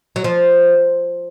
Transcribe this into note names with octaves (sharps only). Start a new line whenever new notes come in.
F#3
F3